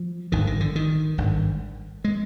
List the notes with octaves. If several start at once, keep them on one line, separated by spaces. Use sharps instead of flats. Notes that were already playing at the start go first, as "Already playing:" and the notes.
Already playing: F3
G#1 G2 D3 D#3
D#3
D3
D#3
G#1 G2 D3
G#3